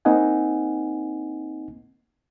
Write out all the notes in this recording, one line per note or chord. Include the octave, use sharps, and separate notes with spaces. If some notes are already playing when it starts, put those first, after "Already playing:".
A#3 C4 D#4 D#5 F#5 G#5